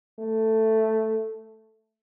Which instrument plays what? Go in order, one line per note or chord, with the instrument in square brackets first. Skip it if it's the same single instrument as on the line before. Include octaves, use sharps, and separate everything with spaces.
[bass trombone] A3